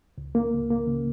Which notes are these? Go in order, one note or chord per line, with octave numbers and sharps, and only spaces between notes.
C#2
A#3
C#2
A#3
C#3